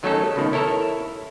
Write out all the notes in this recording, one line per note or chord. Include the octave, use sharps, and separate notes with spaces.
D#3 F#3 A3 C#4 D#4 A4
C#2 B2 D#3
E4 A4 A#4 C#5 E5